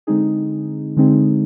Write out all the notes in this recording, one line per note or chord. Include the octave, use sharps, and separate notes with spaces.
D3 G#3 C4 D#4 G#4
D3 G#3 C4 D#4 G#4